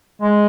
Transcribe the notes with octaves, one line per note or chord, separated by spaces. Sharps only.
G#3